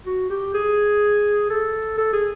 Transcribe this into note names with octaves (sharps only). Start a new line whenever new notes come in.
F#4
G4
G#4
A4
A4
G#4